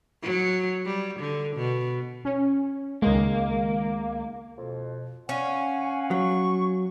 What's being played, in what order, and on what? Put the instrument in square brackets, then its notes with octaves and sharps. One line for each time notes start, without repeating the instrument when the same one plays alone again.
[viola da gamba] F#3
G3
D3
B2
[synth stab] C#4
[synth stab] C#2 D#3 G#3 [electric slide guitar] A#3
[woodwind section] F2 B2
[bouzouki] C#4 [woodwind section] F5 F#5 [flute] G#5
[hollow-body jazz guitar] F#3 [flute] C#6